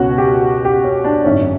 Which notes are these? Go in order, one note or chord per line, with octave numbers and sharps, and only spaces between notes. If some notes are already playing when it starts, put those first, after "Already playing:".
Already playing: C#2 B2 C#4 F#4
G4
G4
C#4
D4
G#1 F#2 D3 C#4